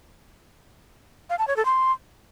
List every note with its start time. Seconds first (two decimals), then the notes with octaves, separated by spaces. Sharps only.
1.30 F5
1.39 A5
1.48 C#5
1.57 A4
1.65 C6